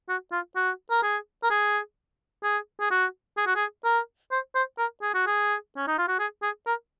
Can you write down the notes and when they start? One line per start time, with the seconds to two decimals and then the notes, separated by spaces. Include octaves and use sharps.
0.09 F#4
0.32 F4
0.56 F#4
0.91 A#4
1.03 G#4
1.43 A#4
1.50 G#4
2.43 G#4
2.80 G#4
2.91 F#4
3.38 G#4
3.47 F#4
3.56 G#4
3.85 A#4
4.32 C5
4.55 C5
4.78 A#4
5.02 G#4
5.14 F#4
5.27 G#4
5.77 C#4
5.88 D#4
5.98 F4
6.08 F#4
6.19 G#4
6.43 G#4
6.67 A#4